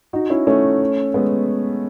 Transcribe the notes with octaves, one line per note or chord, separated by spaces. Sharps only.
D#4 F#4
C#4 E4
A3 C#4
G#3 B3